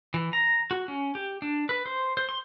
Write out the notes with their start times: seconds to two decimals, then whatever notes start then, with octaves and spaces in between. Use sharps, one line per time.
0.14 E3
0.33 A#5
0.71 F#4
0.88 C#4
1.15 G4
1.42 D4
1.69 B4
1.86 C5
2.17 C5
2.29 C6